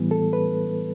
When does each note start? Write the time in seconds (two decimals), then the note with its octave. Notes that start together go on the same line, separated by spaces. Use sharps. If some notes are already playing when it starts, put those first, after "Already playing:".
Already playing: A2 E3 G3 B3
0.11 A4
0.33 B4